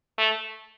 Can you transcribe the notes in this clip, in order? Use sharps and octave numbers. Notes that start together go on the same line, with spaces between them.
A3